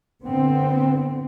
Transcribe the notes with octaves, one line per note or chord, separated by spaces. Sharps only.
A#2 D3 B3 C4